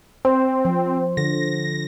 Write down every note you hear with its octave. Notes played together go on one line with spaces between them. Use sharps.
C4 C5
F3
D3 A#6